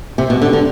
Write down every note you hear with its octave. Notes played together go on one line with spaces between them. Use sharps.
C3 G#3 C4 G4
B2
D3
D3